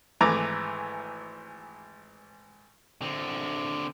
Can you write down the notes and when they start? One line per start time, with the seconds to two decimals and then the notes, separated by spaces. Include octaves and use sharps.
0.21 G#1 E3 A3 A#5 D6
3.01 D3 C4